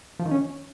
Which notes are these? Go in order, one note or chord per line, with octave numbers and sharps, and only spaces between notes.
F3
D#3
C#4